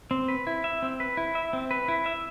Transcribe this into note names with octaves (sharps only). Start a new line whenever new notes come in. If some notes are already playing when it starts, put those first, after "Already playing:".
C4
B4
E4
E5
C4
B4
E4
E5
C4
B4
E4
E5